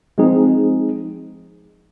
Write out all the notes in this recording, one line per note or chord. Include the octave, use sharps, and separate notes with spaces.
F3 G#3 C4 D#4 G#4